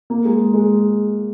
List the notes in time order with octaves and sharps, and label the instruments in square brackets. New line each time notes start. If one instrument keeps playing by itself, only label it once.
[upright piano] A#3
G#3
G#3